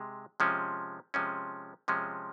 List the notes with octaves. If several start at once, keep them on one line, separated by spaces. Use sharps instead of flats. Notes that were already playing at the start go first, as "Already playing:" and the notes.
Already playing: C3 G#3
C3 F3 G#3 C#4
C3 F3 G#3 C#4
C3 F3 G#3 C#4